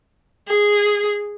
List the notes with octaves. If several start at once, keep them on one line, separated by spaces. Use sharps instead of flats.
G#4